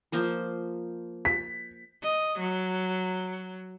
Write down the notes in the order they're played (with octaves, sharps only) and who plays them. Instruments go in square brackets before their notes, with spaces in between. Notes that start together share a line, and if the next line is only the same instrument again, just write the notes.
[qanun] F3 A#3 C5
[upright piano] B6
[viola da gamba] D#5
F#3